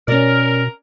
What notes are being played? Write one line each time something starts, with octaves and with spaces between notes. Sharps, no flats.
B2 C#4 A#4 D5